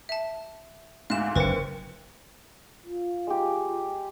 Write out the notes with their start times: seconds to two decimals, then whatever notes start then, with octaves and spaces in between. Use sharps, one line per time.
0.09 E5 A5
1.10 D2 G#2 F5 E7
1.36 F#1 D#2 B4 C5 C#7
2.86 F4
3.27 G#3 G4